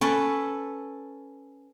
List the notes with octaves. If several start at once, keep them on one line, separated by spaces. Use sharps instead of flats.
C#4 A4 B4